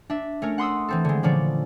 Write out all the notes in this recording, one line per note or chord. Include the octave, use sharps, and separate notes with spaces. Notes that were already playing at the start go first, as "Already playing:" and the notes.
D4 E5
A3 C#4 A#4
F#5 C6 D#6 E6
E3 C4 A4
D3 G#3
A#2 D3 F3 C#4 D5